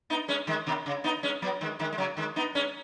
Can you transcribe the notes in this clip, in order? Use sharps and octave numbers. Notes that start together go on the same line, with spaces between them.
B3 D#4
G#3 C#4
D#3 G#3
B2 D#3
C#3
B3 D#4
G#3 C#4
F#3 B3
D#3 G#3
D#3 G#3
G#3
C#3 F#3
D#3 G#3
B3 D#4
G#3 C#4